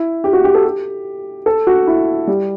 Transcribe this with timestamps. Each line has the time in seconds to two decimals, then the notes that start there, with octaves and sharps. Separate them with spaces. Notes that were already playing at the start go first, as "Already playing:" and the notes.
Already playing: E4
0.24 G4
0.33 F#4
0.44 G4
0.55 A4
0.64 G4
1.46 A4
1.67 F#4
1.87 E4
2.27 G3